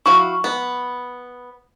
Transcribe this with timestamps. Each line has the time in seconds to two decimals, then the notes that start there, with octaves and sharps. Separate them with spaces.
0.06 E4 F#4 F5 C#6
0.44 B3